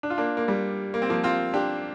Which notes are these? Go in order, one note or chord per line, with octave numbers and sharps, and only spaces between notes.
D4
F4
A#3 D4
A#3
G3
A#3
C4
F3 A#3
C4 F4
D4 G4